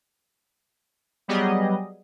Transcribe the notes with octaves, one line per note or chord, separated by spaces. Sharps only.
F#3 G3 B3 G4 G#4 D#5